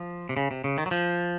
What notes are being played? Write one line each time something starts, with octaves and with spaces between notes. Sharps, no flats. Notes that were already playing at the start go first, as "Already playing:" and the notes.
Already playing: F3
C3
C#3
C3
C#3
D#3
F#3
F3